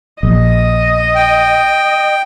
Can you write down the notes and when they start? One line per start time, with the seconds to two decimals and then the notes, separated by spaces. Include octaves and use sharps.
0.23 A#1 D#5
1.15 G5